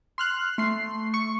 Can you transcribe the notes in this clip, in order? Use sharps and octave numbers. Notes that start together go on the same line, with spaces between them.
C6 F6 F#6
A3 C6 C7
C#6